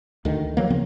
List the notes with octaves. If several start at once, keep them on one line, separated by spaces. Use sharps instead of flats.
D2 D3 D#3
F3 F#3 A#3
C#3 F3 B3 C4